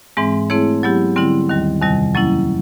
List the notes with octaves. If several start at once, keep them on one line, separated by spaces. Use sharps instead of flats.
G#2 E3 G#3 C4
A3 C4 E4 G#4 C#5
F#3 B3 E4 G4
D3 G3 C4 E4
D#2 D#3 G3
F2 C3 D#3 G3
F#3 A#3 C#4 E4